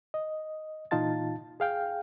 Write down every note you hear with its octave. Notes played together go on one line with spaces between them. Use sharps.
D#5
A#2 E3 D#4 F4 A5 A6
G#4 F5 G5